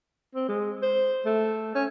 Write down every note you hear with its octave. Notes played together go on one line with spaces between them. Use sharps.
C4
G#3
C5
A3
C#4